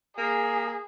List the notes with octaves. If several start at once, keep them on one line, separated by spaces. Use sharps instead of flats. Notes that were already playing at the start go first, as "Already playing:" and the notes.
A#3 G#4